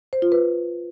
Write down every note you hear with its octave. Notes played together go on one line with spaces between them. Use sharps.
C5
F4
B4